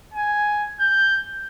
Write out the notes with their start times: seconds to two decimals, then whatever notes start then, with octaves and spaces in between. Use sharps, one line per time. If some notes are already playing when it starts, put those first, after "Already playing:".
0.14 G#5
0.80 G6